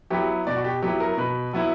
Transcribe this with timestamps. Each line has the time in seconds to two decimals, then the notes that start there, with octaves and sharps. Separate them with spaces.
0.10 F#3 B3 E4 G4
0.47 B2 D5
0.56 F#4
0.65 G4
0.83 F#3 B3 E4 G4
1.00 A#4
1.17 B2 B4
1.53 F#3 B3 E4